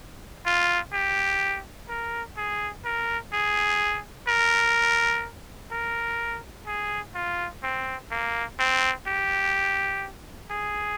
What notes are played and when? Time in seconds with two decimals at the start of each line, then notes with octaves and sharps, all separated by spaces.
0.45 F4
0.92 G4
1.88 A#4
2.37 G#4
2.84 A#4
3.32 G#4
4.27 A#4
5.71 A#4
6.67 G#4
7.15 F4
7.63 C4
8.11 A#3
8.59 C4
9.07 G4
10.50 G#4